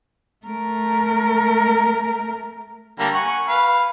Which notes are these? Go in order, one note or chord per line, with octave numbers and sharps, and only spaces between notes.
A3 A#4
D3 G3 A#3
F#5 G#5 C#6
B4 F5